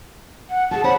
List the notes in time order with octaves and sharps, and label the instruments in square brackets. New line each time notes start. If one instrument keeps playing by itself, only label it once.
[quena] F#5
[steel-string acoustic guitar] F#4 G#4 [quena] A5
[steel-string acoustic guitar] C5 C#5 F#5 [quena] B5